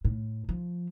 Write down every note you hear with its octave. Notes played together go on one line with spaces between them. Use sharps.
A2
F3